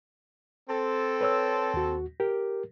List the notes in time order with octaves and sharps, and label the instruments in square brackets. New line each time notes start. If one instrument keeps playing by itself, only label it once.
[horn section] C4 A4
[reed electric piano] B4 C#5 E6
D#2 F#4
G4 A#4